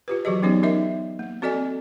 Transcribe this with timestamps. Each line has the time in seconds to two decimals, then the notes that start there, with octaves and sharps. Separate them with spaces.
0.08 F4 G4 B4
0.25 E3 F#3 F#4 G#4 D#5
0.43 F#3 B3 C#4 D#4 G4 C#5
0.63 D#4 A#4 D#5 E5
1.19 A#3
1.42 C4 F#4 A4 D5 D#5 G#5